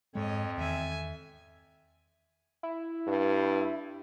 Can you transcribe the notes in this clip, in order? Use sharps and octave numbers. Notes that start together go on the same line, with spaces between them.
F2 G#2 G#3 C#5 D#5
E2 D#3 E5 G#5
E4
G2